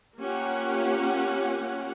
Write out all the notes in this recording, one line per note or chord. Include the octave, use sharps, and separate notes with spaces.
A#3 C#4 F4 G4 C#5 F#5